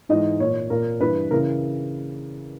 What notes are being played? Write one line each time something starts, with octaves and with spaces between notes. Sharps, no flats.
G#2 E3 D#5
A#2 C#5
A#2 A#4
G2 E3 B4
C#3 E3 A#4